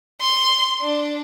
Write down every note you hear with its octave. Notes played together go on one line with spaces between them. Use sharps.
C6
D4